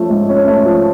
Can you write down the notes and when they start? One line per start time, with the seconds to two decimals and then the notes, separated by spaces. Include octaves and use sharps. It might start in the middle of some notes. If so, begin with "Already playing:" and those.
Already playing: F3 A3 C#4
0.10 G#2
0.29 C#4
0.47 A3
0.66 F3